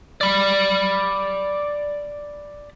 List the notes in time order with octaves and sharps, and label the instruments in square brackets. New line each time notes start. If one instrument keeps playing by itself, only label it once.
[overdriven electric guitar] D5 B5